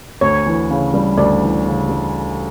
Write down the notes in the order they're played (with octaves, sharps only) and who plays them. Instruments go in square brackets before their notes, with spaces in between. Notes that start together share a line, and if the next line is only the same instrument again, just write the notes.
[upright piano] D2 [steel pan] C#5
[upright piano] E3
C#3
G3
[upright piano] D2 [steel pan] D5
[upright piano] E3
C#3
G3